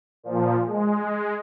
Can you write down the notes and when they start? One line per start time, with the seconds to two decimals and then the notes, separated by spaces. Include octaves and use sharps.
0.23 A#2 F3
0.66 G#3